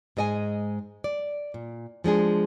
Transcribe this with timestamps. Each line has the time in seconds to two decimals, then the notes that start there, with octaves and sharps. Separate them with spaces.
0.17 G#2 G#3 D#5 G5 G#5
1.04 D5
1.54 A#2
2.04 F3 G#3 D4 G#4